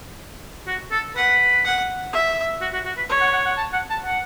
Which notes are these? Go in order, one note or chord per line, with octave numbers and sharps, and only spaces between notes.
F#4
A4
B4 F#5
F#5
E5
F#4
F#4
F#4
B4
C#5
F#5
F#5
F#5
A5
F#5
A5
F#5